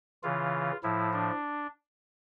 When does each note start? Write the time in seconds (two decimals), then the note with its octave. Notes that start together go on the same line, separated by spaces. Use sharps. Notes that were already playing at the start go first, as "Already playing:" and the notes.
0.23 C#3 E3 F4
0.83 A2 F3 E4
1.13 D4